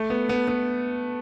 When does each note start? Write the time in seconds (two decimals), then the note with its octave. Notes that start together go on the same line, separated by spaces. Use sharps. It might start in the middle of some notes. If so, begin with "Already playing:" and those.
Already playing: A3
0.10 B3
0.29 B3
0.48 B3